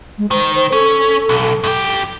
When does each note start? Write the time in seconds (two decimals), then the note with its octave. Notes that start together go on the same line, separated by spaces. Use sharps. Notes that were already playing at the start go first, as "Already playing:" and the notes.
0.18 G#3
0.31 D#3 C5
0.54 C5
0.73 C#4 A4
1.29 B1
1.64 F#2 G4